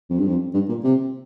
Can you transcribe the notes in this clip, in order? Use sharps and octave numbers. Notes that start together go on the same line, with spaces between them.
F2
G2
F2
G2
A#2
C3